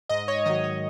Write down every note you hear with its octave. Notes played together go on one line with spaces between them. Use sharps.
G#2 D#5
C#5
D#3 F#3 D#5
C#5